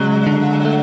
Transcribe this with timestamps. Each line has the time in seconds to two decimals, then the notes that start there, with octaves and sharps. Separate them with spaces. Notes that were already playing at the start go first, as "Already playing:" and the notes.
Already playing: C#3 F#3 G#3
0.27 D3
0.65 A3